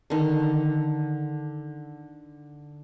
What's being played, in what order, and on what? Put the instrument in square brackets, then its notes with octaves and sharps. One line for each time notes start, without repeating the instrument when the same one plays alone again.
[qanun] D3 D#3